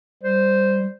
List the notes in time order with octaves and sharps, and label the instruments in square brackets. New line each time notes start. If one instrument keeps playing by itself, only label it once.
[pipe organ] G3 [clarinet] C5